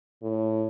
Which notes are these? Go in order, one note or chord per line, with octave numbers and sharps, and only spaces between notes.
A2